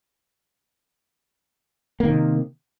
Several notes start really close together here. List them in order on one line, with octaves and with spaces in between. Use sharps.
A#3 D#3 C3